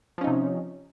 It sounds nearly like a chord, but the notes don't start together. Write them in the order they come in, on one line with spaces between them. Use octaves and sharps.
F3 C#4 D#4 C3